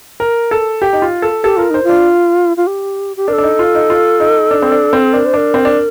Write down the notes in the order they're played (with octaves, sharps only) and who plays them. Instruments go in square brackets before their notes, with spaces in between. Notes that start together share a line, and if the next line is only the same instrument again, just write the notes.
[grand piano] A#4
A4
G4
D#4
F4
A4
[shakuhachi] G4 [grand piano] A4
[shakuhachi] F4 [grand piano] A#4
[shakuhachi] D#4 [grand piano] C5
[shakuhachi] F4
[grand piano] D4
[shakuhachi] F4
G4
G4
[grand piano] D4 [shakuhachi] A#4
[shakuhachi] A4
[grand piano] D4
D#4
F4
D#4
F4
D#4
D4
C4
D4
C4
[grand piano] D4 [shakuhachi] A#4
[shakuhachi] C5
[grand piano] D4 [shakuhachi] A#4
[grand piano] C4
D4